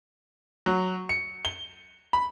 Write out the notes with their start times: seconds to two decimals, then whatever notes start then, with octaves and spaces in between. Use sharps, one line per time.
0.66 F#3
1.09 C#7
1.45 G7
2.13 B5